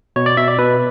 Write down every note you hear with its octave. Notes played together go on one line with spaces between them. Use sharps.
B2 C#5
D5
B2 E5
D5
B2 B4